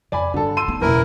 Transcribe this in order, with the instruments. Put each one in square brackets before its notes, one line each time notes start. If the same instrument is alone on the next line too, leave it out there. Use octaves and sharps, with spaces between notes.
[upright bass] F2 C#3 [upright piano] D5 G#5 B5
[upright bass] G2 [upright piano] D3 A4
[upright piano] C6 E6 D#7
[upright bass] B3 D#4
[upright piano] F#1 [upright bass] E2 B2 [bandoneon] E4 A#4